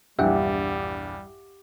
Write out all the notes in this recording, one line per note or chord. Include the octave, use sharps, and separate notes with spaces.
A#1 E2 G2 G3 G4 E5 F#5 G5